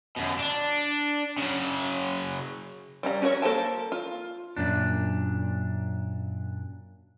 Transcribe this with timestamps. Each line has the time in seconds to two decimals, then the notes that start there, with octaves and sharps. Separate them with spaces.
0.16 F#2 B2
0.39 D4
1.38 C#3 F#3
3.03 G3 C#4 A#5
3.22 C#4 F#4 A4 A#4 C#5
3.42 A#3 A4 C5 G5 A5
3.92 F4
4.57 F#2 A#2 D4